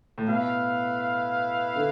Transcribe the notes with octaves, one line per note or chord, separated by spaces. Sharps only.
A2
B2 E4 B4 F5
D3